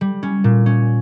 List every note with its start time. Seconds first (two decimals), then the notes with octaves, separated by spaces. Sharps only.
0.01 G3
0.23 C#4
0.44 A#2
0.66 C#4